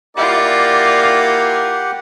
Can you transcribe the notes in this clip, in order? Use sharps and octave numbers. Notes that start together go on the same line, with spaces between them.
A#3 E4 F4 G4 D5 F#5